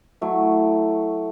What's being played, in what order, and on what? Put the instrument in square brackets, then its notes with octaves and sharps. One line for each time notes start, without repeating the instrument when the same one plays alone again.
[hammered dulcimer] F#3 A3 E4